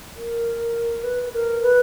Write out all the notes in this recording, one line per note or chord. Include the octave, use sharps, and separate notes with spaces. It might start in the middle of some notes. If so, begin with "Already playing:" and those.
A#4
B4
A#4
B4